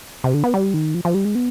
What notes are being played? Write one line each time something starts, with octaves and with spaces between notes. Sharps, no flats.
C3
D3
B3
G3
D#3
F3
F3
G3
G#3
B3